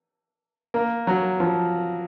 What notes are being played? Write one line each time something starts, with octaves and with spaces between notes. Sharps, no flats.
A#3
F#3
F3